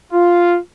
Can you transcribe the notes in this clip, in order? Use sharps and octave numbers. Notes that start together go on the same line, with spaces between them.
F4